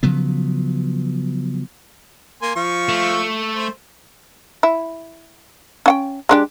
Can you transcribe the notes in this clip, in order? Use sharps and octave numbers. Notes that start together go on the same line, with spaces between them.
C#3 F3 F#3 B3
A#3 G#5 C6
F3 F4 C#6
A3
C5
E4
C#4 F#5 G5
G#3 D4 G4